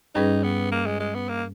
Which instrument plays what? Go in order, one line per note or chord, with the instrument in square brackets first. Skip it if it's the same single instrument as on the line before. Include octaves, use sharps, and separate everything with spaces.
[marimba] G2 G3 C#4 G#4 B4 [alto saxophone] D#4
[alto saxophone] B3
A#3
G#3
G#3
B3
A#3